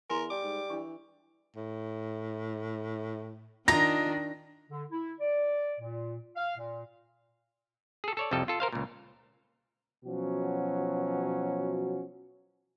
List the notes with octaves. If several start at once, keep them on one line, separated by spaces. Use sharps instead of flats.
E2 A#4 G#5 A#5 C6
G3 D6
G#2
E3 D4 C#6
A2
D#3 D4 F4 D#5 A#5 A#6
D3
E4
D5
A#2
F5
A#2
G#4 A4
A4 C#5 D5
C2 F2 G3 A4 D#5
F4 A4
A#4 C5 F5
C#2 A#2
B2 F3 F#3 C#4 F#4